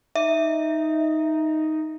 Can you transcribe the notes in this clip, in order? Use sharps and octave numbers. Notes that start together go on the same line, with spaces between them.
D#4 E5